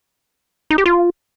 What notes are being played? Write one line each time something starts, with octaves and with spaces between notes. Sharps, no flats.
D#4
G4
F4